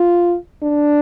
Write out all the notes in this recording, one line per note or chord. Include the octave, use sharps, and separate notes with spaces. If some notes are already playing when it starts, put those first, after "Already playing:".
Already playing: F4
D4